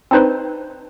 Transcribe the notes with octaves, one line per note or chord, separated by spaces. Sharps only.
C4 D4 D#4 B4 C5